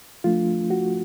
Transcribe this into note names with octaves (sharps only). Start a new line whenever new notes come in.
F3 A3 D4 F4
F#4